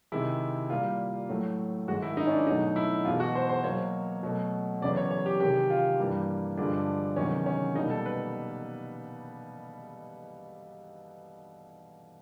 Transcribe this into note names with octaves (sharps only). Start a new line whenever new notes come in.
C3 D#3 G#3 E4
A#2 G3 A#3 F4
A2 F#3 A3
G#2 D#3 G#3 F#4
E4
D#4
C#4
D4
B2 F#3 A3 D#4
E4
E2 B2 G#3 F4
F#4
C5
C5
B2 F#3 A#3 C#5
B2 F#3 A3
E2 C#3 F#3 D5
C#5
C#5
G4
C3 D#3 G#3 G4
F4
G2 E3 G3 A#3
G2 D3 F3 G#3 D4
E2 C3 D#3 F#3 C#4
C#4
B2 G3 A#3 D#4
A4
B4